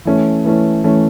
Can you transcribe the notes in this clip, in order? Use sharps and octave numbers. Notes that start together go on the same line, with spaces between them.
E3 A3 C#4
E3 A3 C#4
E3 A3 C#4